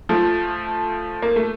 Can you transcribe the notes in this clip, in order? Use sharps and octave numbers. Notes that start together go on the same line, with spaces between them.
F3 A3
A#3
A3